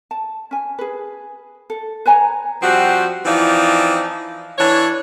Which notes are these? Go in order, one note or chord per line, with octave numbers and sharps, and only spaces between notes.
A5
C#4 G#5
G#4 B4
A4
B4 C#5 G#5 A#5
F3 G3 C4 F#4
E3 F3 C4 D#4 D5
E3 D4 C#5